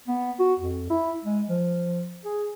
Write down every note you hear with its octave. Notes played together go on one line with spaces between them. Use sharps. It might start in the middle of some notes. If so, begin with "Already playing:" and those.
B3
F#4
F2
E4
G#3
F3
G#4